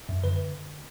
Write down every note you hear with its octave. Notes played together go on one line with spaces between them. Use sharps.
F#2
D3 B4